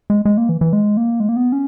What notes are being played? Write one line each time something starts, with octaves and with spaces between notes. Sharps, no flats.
G#3
G#3
A#3
E3
E3
G#3
A#3
G#3
A#3
B3
C#4